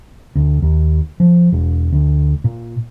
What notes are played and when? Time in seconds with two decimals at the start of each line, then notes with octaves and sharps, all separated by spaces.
0.35 D2
0.62 D#2
1.20 F3
1.52 E1
1.92 D2
2.44 A#2